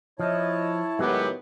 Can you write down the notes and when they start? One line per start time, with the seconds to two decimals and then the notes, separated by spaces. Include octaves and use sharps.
0.20 F3 E4 C#5 D#5 A5
0.99 A2 D#3 F#3 G#3 B3 G4